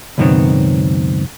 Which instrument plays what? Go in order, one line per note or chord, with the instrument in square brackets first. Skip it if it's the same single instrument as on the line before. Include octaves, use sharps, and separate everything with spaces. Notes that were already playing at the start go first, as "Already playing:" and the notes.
[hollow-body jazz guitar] C#2 F#2 B2 D#3 B3 C4